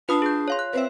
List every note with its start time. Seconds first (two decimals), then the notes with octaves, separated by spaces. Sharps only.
0.09 D4 F4 B4 A5 B5 D#6 C7
0.22 G#4 G6
0.48 C#5 F5 C6
0.59 F#6
0.73 C4 B4 C5 E5